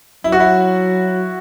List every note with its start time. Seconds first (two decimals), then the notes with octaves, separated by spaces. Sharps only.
0.24 F#3 E4
0.32 F#4
0.40 E4